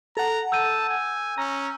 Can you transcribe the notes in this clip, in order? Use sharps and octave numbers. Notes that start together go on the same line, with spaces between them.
A4 F#5 A#5
A5 E6 G6 D#7
G#5
C#4 A#5